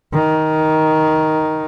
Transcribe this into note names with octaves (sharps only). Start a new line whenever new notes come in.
D#3